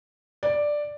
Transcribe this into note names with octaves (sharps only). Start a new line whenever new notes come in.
D5